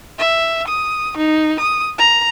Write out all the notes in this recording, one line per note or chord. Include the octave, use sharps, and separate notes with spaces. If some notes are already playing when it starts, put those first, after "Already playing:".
E5
D#6
D#4
D#6
A#5